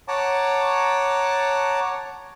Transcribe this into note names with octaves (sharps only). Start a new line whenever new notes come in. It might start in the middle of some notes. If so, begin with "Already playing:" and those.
C#5 F#5 A5 A#5 D6